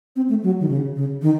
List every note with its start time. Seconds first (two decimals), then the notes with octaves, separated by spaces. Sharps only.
0.16 C4
0.29 A3
0.43 F#3
0.61 D#3
0.69 C#3
0.96 C#3
1.22 D#3